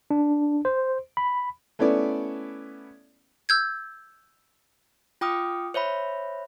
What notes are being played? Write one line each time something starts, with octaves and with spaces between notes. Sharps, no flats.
D4
C5
B5
A3 B3 C#4 E4 D5
E6 G6 G#6
F4 G5 D6 D#6 F6
C5 C#5 E5 B5